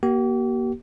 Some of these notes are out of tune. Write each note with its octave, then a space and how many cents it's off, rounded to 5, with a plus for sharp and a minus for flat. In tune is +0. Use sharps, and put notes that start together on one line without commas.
A#3 +25 G4 -40